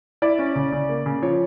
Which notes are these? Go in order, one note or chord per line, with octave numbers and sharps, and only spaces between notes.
E4 D5
C#4
C#3
C#3
A#3
C#3
F3 C#5